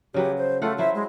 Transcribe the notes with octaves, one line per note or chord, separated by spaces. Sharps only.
C#3 F#3 G4 B4
C5
A3 F4 A4 F#5
F#3 E4 C5 E5
G#3